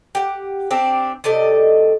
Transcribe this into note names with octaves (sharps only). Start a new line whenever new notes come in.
G4 F#5
C4 D4 G4
C3 A3 D5 D#5